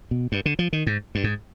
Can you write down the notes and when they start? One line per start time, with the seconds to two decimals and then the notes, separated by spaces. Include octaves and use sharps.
0.11 B2
0.32 G2
0.46 D3
0.59 F3
0.73 D#3
0.87 G#2
1.15 G2
1.24 G#2